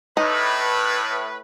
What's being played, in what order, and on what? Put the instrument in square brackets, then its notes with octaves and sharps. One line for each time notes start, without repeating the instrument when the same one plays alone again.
[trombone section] A2 [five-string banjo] D#4 [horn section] B4